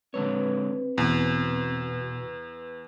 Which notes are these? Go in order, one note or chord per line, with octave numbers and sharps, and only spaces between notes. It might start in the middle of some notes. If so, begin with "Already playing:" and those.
D3 G#3 C4 B4 C#5
E2 B2